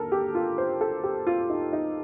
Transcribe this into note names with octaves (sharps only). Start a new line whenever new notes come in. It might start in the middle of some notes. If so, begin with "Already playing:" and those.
Already playing: D#2 D3 A4 A#4
G4
F4
C5
A4
G4
F4
D#4
D#4